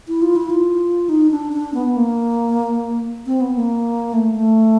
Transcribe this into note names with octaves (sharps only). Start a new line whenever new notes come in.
E4
F4
E4
F4
D#4
D4
D4
B3
A#3
C4
B3
A#3
A3
A3